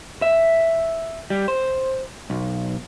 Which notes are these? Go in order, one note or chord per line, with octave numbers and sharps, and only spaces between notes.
E5
G3
C5
B1